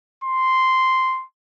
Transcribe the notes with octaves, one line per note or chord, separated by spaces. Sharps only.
C6